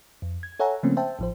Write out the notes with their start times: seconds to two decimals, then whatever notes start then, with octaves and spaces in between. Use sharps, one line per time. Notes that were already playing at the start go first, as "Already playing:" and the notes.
0.22 F2
0.43 G#6
0.60 A4 C#5 E5 F#5 G#5 A#5
0.83 C#3 F3 A3 A#3 C4 C#4
0.97 C5 E5 G5 A5
1.19 A1 F3 C5